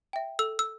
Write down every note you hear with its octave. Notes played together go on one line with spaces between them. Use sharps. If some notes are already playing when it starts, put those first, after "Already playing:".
E5 G5
A4 E6
E6